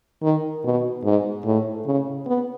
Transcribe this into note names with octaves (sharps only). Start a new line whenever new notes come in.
D#3
B2
G#2
A2
C#3
B3